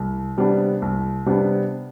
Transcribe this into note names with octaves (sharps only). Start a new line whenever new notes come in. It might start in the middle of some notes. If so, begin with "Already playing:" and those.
Already playing: C2
C3 G3 B3 D4
C2
C3 G3 B3 D4